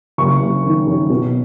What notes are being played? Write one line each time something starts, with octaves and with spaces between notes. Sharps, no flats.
F#1 C#6
F#1
D#3
F#2
B2